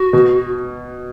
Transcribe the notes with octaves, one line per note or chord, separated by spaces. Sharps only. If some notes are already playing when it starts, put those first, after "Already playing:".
Already playing: F#4
B2